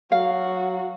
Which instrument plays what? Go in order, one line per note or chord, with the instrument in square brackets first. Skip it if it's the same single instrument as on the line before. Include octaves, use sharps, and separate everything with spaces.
[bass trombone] F#3 [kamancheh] F#4 [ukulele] F5